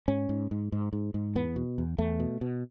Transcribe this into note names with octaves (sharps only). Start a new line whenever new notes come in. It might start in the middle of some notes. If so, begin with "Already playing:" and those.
G#2 C#4
G#2
G#2
G#2
G#2
G#2
E2 B3
B2
E2
E2 A3
B2
B2